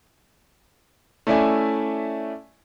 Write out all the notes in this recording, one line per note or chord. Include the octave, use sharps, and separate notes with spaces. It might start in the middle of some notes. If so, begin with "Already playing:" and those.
A3 C#4 E4 D5 E5 G#5